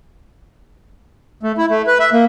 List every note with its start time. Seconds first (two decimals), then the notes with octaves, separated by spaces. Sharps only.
1.43 A3
1.58 E4
1.70 A3
1.87 B4
1.99 E5
2.13 A#3